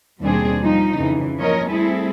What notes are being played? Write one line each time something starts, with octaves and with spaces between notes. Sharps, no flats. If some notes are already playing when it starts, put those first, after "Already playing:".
D#2 B2 G3 C4 D4 G#4
F3 G3 D#4
F2 C#3 E3
F3 A#3 C#4 A#4 C#5 D#5
G3 A3 C4 E4 G#4 A4